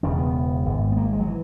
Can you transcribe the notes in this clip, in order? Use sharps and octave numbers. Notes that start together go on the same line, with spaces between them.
E1 E2 C#3 C#4
B3
G#1 G#2
B3
A#3
G#3
F#3
E3